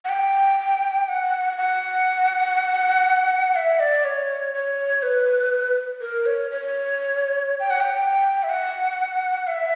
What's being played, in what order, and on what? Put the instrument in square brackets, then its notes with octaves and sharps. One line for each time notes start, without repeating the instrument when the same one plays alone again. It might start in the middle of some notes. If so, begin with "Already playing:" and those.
[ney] F#5
G5
F#5
F#5
E5
D5
C#5
C#5
B4
A#4
C#5
C#5
G5
F#5
G5
E5
F#5
E5